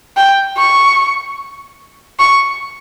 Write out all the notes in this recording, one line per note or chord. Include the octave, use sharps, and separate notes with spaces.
G5
C#6
C#6